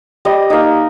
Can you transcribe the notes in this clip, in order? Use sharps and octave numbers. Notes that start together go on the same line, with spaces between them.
G3 D#5
A#3 D#4